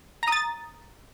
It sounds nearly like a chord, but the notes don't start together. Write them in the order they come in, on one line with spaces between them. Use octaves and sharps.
A#5 D#6 A6